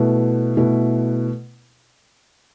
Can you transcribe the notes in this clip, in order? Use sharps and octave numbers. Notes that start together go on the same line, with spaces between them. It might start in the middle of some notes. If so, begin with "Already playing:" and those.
Already playing: B2 A3 E4 B4
B2 A3 E4 B4